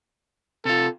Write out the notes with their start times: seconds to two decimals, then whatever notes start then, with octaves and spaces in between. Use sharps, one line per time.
0.65 C3 F4 A4